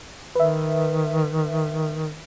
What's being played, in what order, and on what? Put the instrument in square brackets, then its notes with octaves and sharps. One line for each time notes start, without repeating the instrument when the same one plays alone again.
[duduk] D#3 [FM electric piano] B4 E5